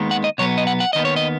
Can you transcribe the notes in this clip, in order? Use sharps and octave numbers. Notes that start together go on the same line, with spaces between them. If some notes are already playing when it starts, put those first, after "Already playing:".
Already playing: D#2 D#3 G#3 B3
F#5
D#5
B2 F#3 B3 C#5
D#5
F#5
F#5
D#2 D#3 B3 D#5
C#5
D#5